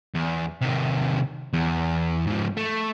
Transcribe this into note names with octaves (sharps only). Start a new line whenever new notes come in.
E2
C3 D#3
E2
G#2 F3
A3